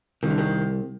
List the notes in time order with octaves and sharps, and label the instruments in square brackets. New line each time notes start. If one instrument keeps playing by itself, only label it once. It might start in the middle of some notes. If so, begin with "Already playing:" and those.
[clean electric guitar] C2 [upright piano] D#3
[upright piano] D3
D#3